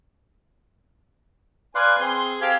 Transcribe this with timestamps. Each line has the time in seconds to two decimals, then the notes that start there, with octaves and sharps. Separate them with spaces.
1.75 B4 D5 F5 G#5 C6 F#6
2.00 C4 G#4 C6
2.41 C4 G4 A4 F5 G#6